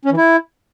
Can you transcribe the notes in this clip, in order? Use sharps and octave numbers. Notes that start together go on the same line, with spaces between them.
C#4
E3
E4